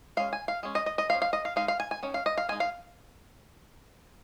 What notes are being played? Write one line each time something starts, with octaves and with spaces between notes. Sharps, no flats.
G#3 C#4 F5
G#5
F5
G#3 C#4
D#5
D#5
D#5
F3 C#4 F5
F5
D#5
F5
G#3 D#4 F5
F5
G#5
G#5
D#3 C#4
F5
D#5
F5
G#3 D#4 G#5
F5